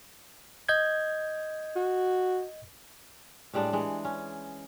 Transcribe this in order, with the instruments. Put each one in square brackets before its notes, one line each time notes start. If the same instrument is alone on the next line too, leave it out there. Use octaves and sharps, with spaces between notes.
[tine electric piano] D#5 G6 G#6
[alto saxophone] F#4
[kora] A2 G3 G#3 D4
E3 G#3
C#4